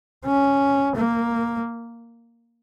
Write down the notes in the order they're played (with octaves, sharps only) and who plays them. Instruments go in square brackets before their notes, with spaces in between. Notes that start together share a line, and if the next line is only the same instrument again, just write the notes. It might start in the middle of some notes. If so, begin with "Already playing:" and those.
[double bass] C#4
A#3